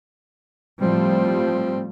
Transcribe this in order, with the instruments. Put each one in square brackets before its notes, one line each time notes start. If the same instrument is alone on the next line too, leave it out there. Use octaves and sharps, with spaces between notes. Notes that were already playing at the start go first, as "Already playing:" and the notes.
[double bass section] A2 F3 G3 [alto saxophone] C4